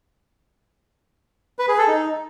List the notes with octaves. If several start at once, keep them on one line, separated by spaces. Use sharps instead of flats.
B4
G#4
A4
D#4